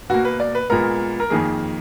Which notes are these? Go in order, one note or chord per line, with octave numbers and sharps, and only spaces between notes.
B2 A#3 F#4
B4
D5
B4
A#2 G#3 B3 A#4
A#4
F2 D#3 A#3 G#4